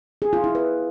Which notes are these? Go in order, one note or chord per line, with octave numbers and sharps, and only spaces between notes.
G#4
F4
E4
B4